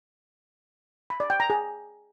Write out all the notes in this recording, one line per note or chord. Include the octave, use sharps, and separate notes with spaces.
B5
D5
G5
A#5
G#4